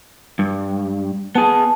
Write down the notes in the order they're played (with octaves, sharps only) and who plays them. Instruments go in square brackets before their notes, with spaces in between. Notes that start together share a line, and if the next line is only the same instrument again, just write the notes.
[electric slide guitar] G2
[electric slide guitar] B3 G#4 [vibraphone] A5